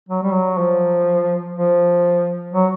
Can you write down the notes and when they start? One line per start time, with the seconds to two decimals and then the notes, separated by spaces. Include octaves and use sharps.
0.09 F#3
0.23 G3
0.33 F#3
0.58 F3
1.55 F3
2.53 F#3